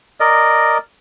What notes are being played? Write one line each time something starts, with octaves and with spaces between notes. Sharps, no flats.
A#4 D5 D#5